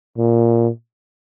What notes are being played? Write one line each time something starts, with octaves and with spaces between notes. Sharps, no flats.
A#2